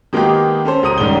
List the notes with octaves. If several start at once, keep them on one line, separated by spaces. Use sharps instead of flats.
D#3 G#3 A#3 B3 D#4 G4
C#4 A4 C5
C#2 A#4 D#6 D#7
G1 G#2 D#3 G3 C#4 G7